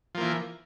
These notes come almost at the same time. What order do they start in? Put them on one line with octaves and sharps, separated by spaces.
F3 A#3 E3